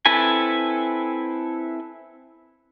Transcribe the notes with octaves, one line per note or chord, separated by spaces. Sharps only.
C4 E4 A4 B4 G#5